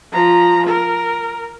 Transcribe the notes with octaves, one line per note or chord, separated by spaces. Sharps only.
F3 A#5
A#4